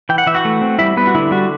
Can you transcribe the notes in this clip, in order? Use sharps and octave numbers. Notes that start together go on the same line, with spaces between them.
E3 G5
F#5
E3 E5
F#4 F#5
A3
C4
G3 E4 E5
G3 B3 B4
F#4
D3 E4
G3 F#4